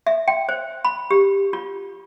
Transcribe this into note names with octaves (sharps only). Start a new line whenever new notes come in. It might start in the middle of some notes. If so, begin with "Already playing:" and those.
E5
G5
C5
B5
G4
F4